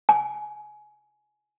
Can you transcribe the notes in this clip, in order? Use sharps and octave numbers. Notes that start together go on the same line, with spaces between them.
G#5